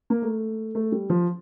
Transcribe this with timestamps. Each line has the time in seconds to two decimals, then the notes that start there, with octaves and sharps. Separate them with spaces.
0.10 A#3
0.22 A3
0.75 A3
0.92 G3
1.10 F3